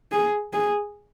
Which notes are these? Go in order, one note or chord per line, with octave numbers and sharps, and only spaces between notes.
G#4
G#4